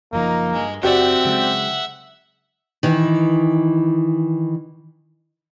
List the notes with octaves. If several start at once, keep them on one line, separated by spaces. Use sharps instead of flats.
F#1 F3 A#3 D#4
G2 G#3
F#1 C4 F#4 G4 D5 E5 F#5
C#3 F#3 G#3
D#3 E3